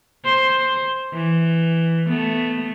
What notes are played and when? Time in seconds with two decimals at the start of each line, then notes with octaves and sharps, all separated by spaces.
0.25 C5
1.14 E3
2.07 A3 B3